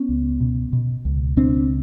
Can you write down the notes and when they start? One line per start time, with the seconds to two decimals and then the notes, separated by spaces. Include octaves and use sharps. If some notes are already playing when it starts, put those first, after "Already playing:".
Already playing: B3 C#4
0.09 C#2
0.40 B2
0.73 B2
1.05 C#2
1.37 C#2 C4 D4